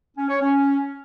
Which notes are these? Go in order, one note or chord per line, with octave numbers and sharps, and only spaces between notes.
C#4
C#5
C#4